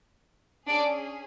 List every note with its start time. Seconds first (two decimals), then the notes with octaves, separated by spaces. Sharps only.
0.68 C#4 D4 G#4 D5